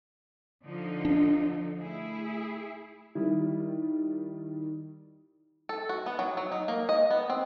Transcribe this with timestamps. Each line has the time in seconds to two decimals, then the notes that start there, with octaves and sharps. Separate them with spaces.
0.63 D3 F3 D#4
1.05 D4
1.80 A3 E4 G#4
3.15 D#3 G3 E4
5.69 A4
5.89 F#4
6.06 B3
6.19 F#3
6.37 F#3
6.52 D#4
6.68 A#3
6.89 D#5
7.11 B3
7.30 C4